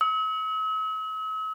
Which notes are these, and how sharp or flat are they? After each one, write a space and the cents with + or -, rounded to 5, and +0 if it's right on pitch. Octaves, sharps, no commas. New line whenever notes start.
E6 -45